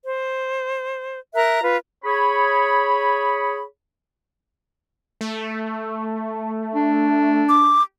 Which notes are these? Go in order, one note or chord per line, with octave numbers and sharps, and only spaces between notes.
C5
A#4 E5 A#5 F#6
F4 B4
G#4 C#5 B5
A3
D4
D6